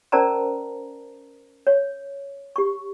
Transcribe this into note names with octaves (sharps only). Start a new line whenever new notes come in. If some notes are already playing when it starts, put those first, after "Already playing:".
C#4 A#4 C5 D5 A5 A#5
C#5
G4 C#6